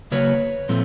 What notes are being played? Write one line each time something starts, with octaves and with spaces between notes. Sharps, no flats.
C#3 F#3 A#3 B4 C#5
A#2 F3 A3 C4